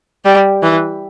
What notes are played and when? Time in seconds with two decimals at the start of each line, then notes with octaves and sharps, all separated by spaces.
0.25 G3
0.63 E3